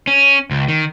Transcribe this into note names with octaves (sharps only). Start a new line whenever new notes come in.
C#4
C#2
D#3